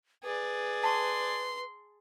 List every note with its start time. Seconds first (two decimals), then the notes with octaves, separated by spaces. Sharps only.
0.23 G#4 B4 D5
0.83 A5 C6 C#6